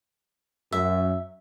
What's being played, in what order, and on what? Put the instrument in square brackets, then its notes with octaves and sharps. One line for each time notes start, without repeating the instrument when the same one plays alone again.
[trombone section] F#2 [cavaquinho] E5